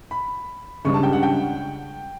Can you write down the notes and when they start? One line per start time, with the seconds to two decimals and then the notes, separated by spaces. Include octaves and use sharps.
0.11 B5
0.85 C#2 C#3 G3 D4 C#6
0.94 A5
1.03 G5
1.13 F#5
1.23 G5